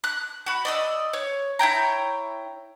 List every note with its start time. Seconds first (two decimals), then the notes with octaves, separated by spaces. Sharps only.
0.04 F#6
0.46 F#4 B5
0.65 D5 D#5 E6
1.13 C#5
1.59 E4 C#5 G5 A#5